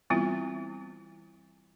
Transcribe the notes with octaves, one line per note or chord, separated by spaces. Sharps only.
E3 G3 B3 C4 E4 F4